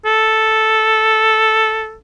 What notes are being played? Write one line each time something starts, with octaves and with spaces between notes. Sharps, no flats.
A4